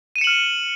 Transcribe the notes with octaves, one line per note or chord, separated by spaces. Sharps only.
F6 C#7 D#7 E7 F#7